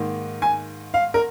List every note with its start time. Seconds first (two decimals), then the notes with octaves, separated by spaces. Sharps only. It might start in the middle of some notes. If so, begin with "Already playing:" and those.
Already playing: G#2 D#3 A#3
0.42 G#5
0.94 F5
1.14 A#4